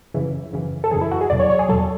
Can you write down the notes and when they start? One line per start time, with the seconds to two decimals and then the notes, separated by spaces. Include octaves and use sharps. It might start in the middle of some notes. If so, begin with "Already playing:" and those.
0.14 F#2 C#3 E3
0.52 F#2 C#3 E3
0.84 A4
0.91 F#2 C#3 E3 G#4
1.01 E4
1.11 F#4
1.21 G#4
1.30 E2 B2 F#3 D5
1.40 C#5
1.50 C#5
1.59 G#4
1.69 E2 B2 F#3 A4